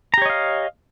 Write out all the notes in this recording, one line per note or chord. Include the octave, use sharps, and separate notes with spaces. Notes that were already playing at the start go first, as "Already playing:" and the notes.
G4 C#5 D#5 F5 A#5